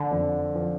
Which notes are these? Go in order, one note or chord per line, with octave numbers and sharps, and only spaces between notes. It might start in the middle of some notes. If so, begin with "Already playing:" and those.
Already playing: D3
F2
F3